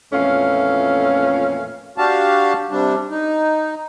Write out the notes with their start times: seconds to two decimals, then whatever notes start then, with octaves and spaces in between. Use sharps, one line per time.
0.13 F2 A#2 E3 A3 C#4 F5
1.98 D4 F#4 G4 F5 A5
2.70 C3 G3 D4
3.10 D#4